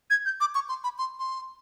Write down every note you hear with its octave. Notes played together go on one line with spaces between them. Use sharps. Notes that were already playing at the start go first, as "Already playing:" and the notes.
G#6
G6
D6
C#6
C6
B5
C6
C6